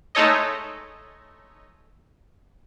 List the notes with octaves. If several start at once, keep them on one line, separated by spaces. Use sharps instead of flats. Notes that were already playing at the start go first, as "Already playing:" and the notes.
G#3 A3 D#4 A4 C#5 D#5